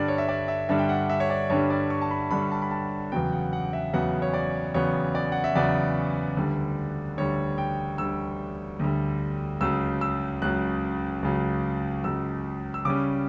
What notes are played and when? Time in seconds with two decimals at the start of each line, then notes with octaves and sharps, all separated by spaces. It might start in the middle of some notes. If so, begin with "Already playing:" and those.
Already playing: G2 D3 G3 D4 D5
0.08 C#5
0.18 E5
0.29 D5
0.48 E5
0.69 G2 D3 G3 D4 E5
0.79 G5
0.89 F#5
1.09 E5
1.20 C#5
1.30 D5
1.50 G2 D3 G3 D4 C#5
1.70 D5
1.90 C#6
2.02 A5
2.11 B5
2.31 G2 D3 G3 D4 B5
2.51 A5
2.62 B5
2.71 A5
3.12 E2 C#3 F#3 B3 G5
3.32 F#5
3.53 F#5
3.73 E5
3.93 E2 C#3 F#3 B3 F#5
4.22 C#5
4.33 D5
4.74 E2 C#3 F#3 B3 C#5
5.15 D5
5.32 F#5
5.44 E5
5.55 E2 C#3 F#3 B3 D5
6.37 D2 D3 G3
7.17 D2 D3 G3 C#5
7.58 G5
7.98 D2 D3 G3 E6
8.79 D2 D3 G3
9.61 C#2 C#3 F#3 E6
10.01 E6
10.42 C#2 C#3 F#3 F#6
11.23 C#2 C#3 F#3
12.04 C#2 C#3 F#3 E6
12.74 E6
12.85 C#3 G3 C#4 D6